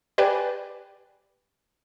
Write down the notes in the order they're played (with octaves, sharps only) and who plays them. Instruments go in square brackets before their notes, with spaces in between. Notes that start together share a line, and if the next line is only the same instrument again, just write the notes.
[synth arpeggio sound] G4 B4 D5 G5 G#5